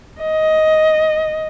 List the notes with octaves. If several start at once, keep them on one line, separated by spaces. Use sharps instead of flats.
D#5